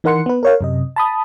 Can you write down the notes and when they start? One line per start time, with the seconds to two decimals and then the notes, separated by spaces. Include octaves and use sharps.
0.04 E3 D#4 A#4 F#5 C6 C#7
0.26 B3 B4
0.43 A#4 C#5 F5
0.61 F#2 C3 D#5
0.96 A5 B5 D#6